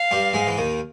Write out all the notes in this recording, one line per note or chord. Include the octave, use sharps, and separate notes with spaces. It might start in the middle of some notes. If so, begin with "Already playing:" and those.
Already playing: F5
G2 G3
G#2 G#3
E3
D#2 D#3